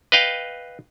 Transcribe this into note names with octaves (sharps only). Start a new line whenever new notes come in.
B4 D#5 F5 G5